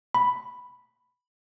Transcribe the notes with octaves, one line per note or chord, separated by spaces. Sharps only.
B5